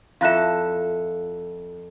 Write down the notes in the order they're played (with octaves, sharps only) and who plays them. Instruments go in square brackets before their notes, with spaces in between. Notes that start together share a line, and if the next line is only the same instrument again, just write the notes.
[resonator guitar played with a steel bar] F2 A4 [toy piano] E4 F4 E5 [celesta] F5 F#6 E7